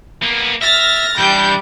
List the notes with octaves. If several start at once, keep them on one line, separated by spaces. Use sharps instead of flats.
A#3 B3
E5 F6 A6 A#6
E3 G3 D4 G6